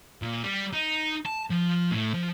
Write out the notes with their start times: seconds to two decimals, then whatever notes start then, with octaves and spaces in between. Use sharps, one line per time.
0.22 A#2
0.44 G3
0.73 D#4
1.25 A5
1.50 F3
1.91 A2
2.14 F3